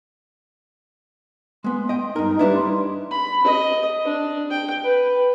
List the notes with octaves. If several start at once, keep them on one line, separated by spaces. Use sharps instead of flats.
G#3 B3 C6
D#5 G5
G2 D#4 A#4
G3 D4 E4 B4
C6
B5
D#5
D4
G5
B4